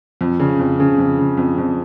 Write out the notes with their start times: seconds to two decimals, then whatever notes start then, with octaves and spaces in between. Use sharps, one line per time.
0.21 F2
0.40 C#3
0.59 F2
0.80 C#3
0.98 F2
1.19 C#3
1.37 F2
1.58 F2